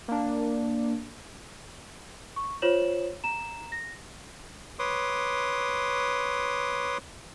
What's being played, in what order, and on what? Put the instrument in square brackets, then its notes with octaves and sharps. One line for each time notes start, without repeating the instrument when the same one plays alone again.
[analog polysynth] A#3 D4
[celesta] C#6
F4 C5 C#5 E7 F#7
A#5 E7
A#6
[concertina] B4 C#5 C6 D6 D#6